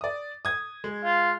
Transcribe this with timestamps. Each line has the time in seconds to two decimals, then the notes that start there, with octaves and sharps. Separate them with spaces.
0.01 D5 D#6
0.45 D#6 G#6
0.84 G#3
1.04 F4